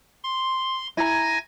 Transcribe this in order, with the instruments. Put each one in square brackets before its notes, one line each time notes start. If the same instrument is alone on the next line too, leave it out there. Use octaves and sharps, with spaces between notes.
[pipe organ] C6
[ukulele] E4 A#5 [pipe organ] G#5 G#6 A#6